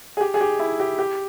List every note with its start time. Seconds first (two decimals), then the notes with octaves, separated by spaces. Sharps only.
0.17 G#4
0.21 G4
0.34 G#4
0.41 G4
0.59 E4
0.80 G4
0.99 G4